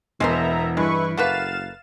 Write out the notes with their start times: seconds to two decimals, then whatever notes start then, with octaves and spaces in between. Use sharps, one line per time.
0.20 E1 E3 G#3 A#3 B3 C5 E5 A#5
0.77 G2 G#3 E4 B4 C#6
1.17 F#1 A3 A#3 B4 F5 F#5 A6 E7